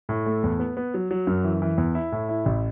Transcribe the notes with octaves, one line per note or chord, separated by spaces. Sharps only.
A2
A3
E2
B3
B3
F#3
F#3
F#2
E3
E3
E2
E4
A2
E4
A1